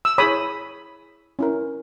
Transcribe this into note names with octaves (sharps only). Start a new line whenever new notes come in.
E6
E4 G#4 C#5 B5 D#6
C#4 E4 A#4